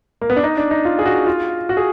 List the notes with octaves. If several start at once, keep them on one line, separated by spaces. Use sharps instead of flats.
A#3
B3
D4
D#4
D4
D#4
F4
G#4
F#4
F4
F#4
G#4